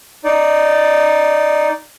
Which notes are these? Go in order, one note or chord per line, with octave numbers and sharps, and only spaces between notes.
D#4 D5